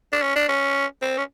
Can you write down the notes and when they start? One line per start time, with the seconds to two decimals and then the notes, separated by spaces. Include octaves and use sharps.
0.13 D4
0.22 C#4
0.36 D4
0.49 C#4
1.02 C4
1.18 C#4